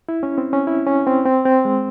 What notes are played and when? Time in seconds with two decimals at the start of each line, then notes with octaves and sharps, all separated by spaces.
0.09 E4
0.23 C#4
0.38 C4
0.53 C#4
0.67 E4
0.87 C#4
1.07 C4
1.26 C4
1.46 C4
1.65 G#3